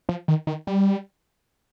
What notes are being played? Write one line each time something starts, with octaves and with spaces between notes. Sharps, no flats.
F3
D#3
D#3
G3